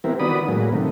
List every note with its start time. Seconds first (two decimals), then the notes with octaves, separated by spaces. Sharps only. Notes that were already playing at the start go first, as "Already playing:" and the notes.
0.04 E3 G3 B3 C4 E4 A#4
0.20 D#3 B3 F#4 D5 B5 D#6
0.48 A2 F#3 G#3 A#3
0.72 C3 D#3 A3